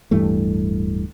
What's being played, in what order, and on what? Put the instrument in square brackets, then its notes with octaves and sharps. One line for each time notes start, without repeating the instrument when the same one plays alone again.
[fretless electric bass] D1 G2 E3 A3